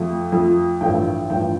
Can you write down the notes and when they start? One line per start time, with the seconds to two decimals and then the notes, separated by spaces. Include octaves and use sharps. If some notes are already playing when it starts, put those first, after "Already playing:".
Already playing: F2 F3 A3
0.32 F2 F3 A3
0.81 A1 G2 F3 A3 G5
1.30 A1 G2 F3 G5